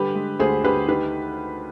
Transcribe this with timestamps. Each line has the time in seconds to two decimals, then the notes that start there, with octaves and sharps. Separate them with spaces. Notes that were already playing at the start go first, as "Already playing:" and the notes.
Already playing: D3 G3 G4 B4
0.15 G#3
0.39 D2 G#4 C5
0.64 D2 G4 B4
0.88 D#3 G4 B4